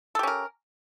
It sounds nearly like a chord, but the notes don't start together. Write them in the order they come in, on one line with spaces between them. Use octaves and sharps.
A4 G4 C#4 A#4